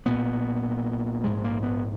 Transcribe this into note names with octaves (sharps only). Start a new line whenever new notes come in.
B1 A#2 B3
A#1 G#2 G#3
A#3
B3